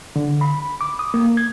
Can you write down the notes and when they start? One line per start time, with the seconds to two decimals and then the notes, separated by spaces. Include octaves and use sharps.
0.16 D3
0.41 B5
0.81 D6
0.99 D#6
1.14 A#3
1.37 G#6